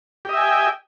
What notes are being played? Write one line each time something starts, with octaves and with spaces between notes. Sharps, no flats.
G4 D#5 E5 G5 G#5